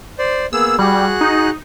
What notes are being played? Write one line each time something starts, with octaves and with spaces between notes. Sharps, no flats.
C5 D5
A#3 B3 G#4 E6
G3 F#4 G#4 F#6
D#4